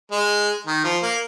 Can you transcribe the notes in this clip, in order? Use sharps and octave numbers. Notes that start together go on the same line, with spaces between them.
G#3
D#3
F3
A#3